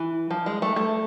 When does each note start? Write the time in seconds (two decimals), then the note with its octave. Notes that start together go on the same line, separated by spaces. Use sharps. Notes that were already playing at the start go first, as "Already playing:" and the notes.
Already playing: E3
0.30 F3
0.46 G#3
0.62 A3
0.76 A3